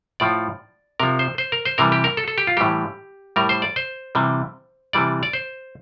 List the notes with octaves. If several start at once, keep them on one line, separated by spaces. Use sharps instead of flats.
A2 F3 D5
C3 F3 A#4
C5
C5
A#4
C5
C3 E3 G3 A#4
G4
A#4
A4
A4
G4
F4
A2 E3 G3 G4
A2 G3 A#4
C5
D5
C5
C3 E3 G3
C3 E3 G3 D5
D5
C5